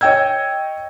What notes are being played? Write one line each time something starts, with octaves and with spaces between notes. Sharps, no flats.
C#5 D#5 G5 E6 G#6